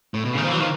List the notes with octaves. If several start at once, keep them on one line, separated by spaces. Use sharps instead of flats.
A2
B2
C#3
D#3
F3
E3 F#3
D#3 F3